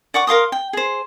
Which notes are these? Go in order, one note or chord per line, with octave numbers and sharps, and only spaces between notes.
D5 F#5 C#6 D6
A#4 F5 C6 D#6
G5
G#4 C5